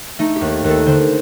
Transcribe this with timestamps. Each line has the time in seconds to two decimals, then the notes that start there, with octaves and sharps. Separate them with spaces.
0.19 A3 D#4
0.36 G4
0.41 D#2
0.64 D#2 A4
0.86 D3 C5